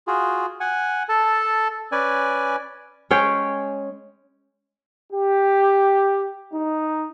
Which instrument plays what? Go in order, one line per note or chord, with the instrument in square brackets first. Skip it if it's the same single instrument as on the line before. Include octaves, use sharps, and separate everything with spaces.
[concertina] F4 F#4 G#4
F#5 G#5
A4 A5
C#4 B4 D5 G#5
[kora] G#3 C#4 C#5 G5
[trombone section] G4
D#4